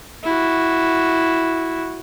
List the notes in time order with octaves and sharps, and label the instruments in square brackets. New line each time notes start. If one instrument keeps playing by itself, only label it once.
[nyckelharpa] E4 F#4